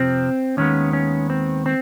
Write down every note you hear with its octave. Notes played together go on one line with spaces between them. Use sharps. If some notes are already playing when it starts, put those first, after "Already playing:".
Already playing: F2 C3 F3 C4
D#2 D#3 G#3 B3 C#4
C#4
C4
C4